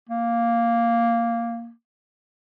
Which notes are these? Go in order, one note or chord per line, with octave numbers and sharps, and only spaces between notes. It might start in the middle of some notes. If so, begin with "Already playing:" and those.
A#3